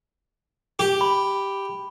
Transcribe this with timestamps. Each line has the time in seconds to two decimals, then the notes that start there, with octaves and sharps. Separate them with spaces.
0.79 G4
1.01 B5